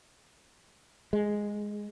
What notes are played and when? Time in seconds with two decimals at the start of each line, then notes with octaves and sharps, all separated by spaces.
1.13 G#3